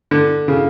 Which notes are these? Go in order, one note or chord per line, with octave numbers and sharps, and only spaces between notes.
D3
C#3